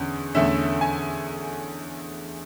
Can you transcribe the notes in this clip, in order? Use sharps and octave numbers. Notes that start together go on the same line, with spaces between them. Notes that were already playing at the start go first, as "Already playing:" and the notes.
Already playing: E2 D3 C#4
E2 D3 A3 C#4 E5
G#5